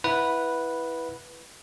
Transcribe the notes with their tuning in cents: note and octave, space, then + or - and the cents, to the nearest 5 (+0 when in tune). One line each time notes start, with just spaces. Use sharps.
E4 +0 B4 -5 F#5 -15